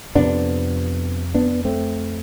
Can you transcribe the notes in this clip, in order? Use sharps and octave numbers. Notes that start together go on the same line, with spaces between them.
F2 C3 B3 D4
B3 D4
A3 C4